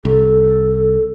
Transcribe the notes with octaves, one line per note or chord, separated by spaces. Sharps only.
C2 A4